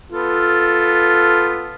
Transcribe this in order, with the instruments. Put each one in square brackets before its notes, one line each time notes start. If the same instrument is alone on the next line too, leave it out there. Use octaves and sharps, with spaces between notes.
[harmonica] B3 F4 A4